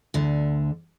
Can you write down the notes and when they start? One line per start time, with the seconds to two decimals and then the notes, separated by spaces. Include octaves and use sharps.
0.14 D2 D3